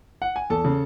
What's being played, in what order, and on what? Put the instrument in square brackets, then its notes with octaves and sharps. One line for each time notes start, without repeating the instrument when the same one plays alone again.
[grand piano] F#5
G#5
E2 A4 A5
C#3